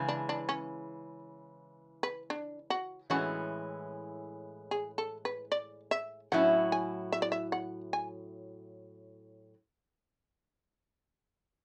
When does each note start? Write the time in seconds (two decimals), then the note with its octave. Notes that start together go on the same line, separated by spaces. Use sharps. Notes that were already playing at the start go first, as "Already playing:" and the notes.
Already playing: C#3 E3 G#3
0.09 D4
0.29 D4
0.49 C#4
2.03 B4
2.30 D4
2.70 F#4
3.10 A2 E3 G#3 C#4 F#4
4.71 G#4
4.98 A4
5.25 B4
5.52 D5
5.91 E5
6.32 A2 F#3 C#4 E4 F#5
6.72 G#5
7.12 E5
7.22 D5
7.32 E5
7.52 F#5
7.93 G#5